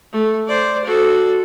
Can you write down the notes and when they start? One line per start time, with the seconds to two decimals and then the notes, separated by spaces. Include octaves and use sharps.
0.13 A3
0.47 C5 D5
0.85 F#4 A4